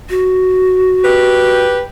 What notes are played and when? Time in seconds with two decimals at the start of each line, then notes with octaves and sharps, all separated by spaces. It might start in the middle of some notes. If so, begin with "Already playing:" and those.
0.10 F#4
1.04 G4 B4